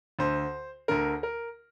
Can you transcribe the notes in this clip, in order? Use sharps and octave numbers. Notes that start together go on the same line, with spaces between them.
D2 D3 C5
D2 D3 A#4
A#4